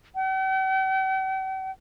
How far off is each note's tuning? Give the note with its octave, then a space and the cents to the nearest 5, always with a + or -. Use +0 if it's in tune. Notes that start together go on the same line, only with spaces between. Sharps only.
G5 -45